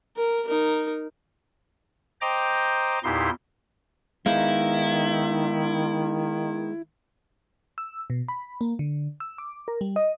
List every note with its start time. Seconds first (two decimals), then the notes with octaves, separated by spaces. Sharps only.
0.17 A#4
0.47 D#4 A#4
2.21 C5 D#5 G5 A#5 D6
3.04 E2 A#2 D#4 E4 G4 C6
4.26 D#3 G#3 B3 D#4 E4 F5
7.78 E6
8.10 B2
8.28 B5
8.61 A#3
8.79 D3
9.20 E6
9.38 D6
9.68 A#4
9.81 G3
9.96 D#5